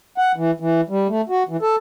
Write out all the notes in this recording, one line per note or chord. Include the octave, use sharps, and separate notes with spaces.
F#5
E3
E3
G3
A3
F#4
E3
A4